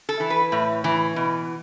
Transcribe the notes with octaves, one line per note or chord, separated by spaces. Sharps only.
A4
E3
B4
A2
E3
B2